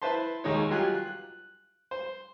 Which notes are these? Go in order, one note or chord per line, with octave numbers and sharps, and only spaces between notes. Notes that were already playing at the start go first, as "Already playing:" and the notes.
E4 B4 C5 A5 C6
D#2 G#3 D#4 C#5
F#3 F4 G4 G#5 F#6
F#6
C5